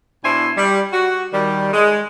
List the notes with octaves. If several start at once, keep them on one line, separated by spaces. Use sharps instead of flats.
B2 D4 E4 G#5 C6
G3
F#4
D#3 G3
G#3